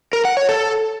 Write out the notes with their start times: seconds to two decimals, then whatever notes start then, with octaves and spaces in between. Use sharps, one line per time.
0.13 A#4
0.25 F#5
0.37 C#5
0.49 A4